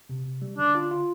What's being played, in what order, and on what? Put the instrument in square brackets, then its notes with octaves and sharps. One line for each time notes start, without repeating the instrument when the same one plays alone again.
[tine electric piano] C3
C3
G3
[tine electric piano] D3 [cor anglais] D4
[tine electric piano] F4
F4